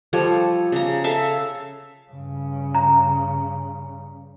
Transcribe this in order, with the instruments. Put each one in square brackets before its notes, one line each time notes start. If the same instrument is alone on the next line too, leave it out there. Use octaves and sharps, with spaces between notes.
[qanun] F3 G3 A4 C#5
C#3 A#5
A4 E5 F5
[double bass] G2 C#3
[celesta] A#5